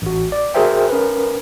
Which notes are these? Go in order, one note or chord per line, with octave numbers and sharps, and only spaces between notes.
A1 F#4
D5
F#4 G#4 A#4 C5 E5 G5
C#4 A#4 B4